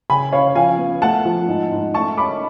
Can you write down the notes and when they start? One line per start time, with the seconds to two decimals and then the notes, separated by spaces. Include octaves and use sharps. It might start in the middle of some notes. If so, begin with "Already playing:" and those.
0.10 C#3 G#5 B5
0.32 C#4 C#5 F5
0.55 F3 F5 G#5
0.78 B3
1.02 A3 F#5 A5
1.25 F3
1.48 G#2
1.71 G#2
1.94 A3 A5 C#6
2.17 C#4 B5 D6